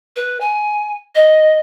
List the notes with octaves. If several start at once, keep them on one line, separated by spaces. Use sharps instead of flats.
B4
G#5
D#5